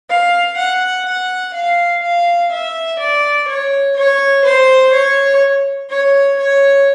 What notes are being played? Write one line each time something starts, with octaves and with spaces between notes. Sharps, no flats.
F5
F#5
F#5
F5
F5
E5
D5
C#5
C#5
C5
C#5
C#5
C#5